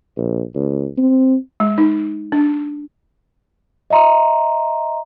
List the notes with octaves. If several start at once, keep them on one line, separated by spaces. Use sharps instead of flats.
A#1
C#2
C4
G#3
D#4
D4
D#5 E5 A#5 C6